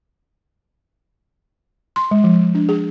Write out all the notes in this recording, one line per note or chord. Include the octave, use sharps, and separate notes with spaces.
C6
G#3
F3
D4
G#4